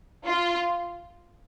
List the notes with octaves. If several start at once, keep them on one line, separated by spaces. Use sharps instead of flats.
F4